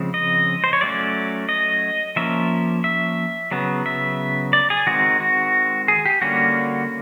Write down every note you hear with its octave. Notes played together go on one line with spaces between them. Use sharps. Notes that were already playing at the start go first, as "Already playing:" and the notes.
Already playing: C#3 F3 G#3 C4
D#5
C5
C#5
F#3 A3 C#4 D5
D#5
F3 A#3 C#4 E5
E5
C#3 F#3 B3
E5
D5
G#4
D#3 G#3 C4 F#4
F#4
G#4
G4
D3 G3 A#3 C#4 F#4